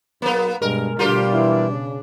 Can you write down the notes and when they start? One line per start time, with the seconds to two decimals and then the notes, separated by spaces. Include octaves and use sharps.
0.22 B1 A#3 B3
0.62 G2 B2 G#3 A#4
0.99 D2 B2 G3 D4 F4 G4 A#4
1.32 E3 E4
1.71 C#3